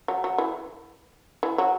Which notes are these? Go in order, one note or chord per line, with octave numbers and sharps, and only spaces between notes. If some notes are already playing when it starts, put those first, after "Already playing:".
F#3
F#3
E3
E3
F#3